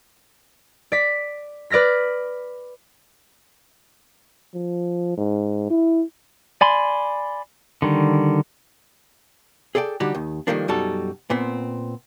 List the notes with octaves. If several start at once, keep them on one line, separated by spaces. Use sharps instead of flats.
D5 B6
B4 D5 F6 A#6 B6
F3
G#2
E4
D5 G#5 B5 C6
D3 D#3 G3
G#4 A4 D5 F#5 G5
D3 G3 D4 D#4 F#4 G4
D#2 D#3
D#3 F3 G3 A3 A#3 D4
F#2 B2 G3 D#4 F#4 A4
A#2 B3 C4